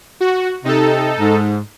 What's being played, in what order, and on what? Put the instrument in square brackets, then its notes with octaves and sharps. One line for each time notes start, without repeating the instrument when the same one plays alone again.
[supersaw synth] F#4
[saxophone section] C3 [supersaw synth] D#4 A4
[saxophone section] G#2